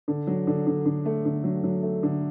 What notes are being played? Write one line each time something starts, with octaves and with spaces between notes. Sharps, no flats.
D3
F#3
D3
D3
D3
A3
D3
F#3
F#3
A3
D3